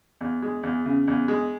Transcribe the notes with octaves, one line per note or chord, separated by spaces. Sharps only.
E2
G#3
E2
C#3
E2
G#3